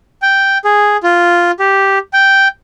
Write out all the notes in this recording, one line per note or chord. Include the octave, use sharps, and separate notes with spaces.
G5
G#4
F4
G4
G5